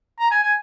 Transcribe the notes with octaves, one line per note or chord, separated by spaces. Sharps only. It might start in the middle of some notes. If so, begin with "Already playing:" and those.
A#5
G#5
G#5